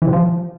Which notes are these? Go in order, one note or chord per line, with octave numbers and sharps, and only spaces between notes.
E3
C3
F3